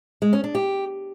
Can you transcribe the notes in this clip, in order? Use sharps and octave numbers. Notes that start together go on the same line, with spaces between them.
G#3
C#4
D4
G4